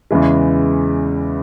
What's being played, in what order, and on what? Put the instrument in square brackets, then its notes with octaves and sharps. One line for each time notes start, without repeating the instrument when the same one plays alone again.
[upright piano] E2 C#3 E3 G#3